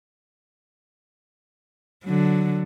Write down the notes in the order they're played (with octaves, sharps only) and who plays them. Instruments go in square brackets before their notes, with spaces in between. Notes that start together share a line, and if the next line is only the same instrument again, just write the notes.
[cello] D3 F#3